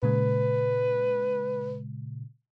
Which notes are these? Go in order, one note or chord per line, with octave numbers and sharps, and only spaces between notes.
A#2 C#3 G#3 B4